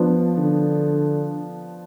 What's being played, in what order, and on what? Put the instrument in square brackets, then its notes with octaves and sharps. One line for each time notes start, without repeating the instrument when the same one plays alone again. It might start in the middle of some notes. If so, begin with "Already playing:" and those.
Already playing: [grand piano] F3 B3 D4
[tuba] D3